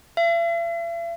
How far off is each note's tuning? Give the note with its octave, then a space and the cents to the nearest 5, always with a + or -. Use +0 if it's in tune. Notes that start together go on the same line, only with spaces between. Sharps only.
E5 +45